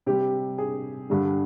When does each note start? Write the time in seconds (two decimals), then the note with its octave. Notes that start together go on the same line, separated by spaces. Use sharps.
0.06 C3 G3 G4
0.58 G#4
1.10 G2 D3 G3